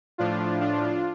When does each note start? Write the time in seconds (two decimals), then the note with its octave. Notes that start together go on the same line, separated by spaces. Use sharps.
0.18 A2 F3 D4 F4
0.61 D4 F4